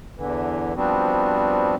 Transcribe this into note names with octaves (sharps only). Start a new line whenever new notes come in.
E2 D3 E3
F3 G3 B3 C4 D4 F#4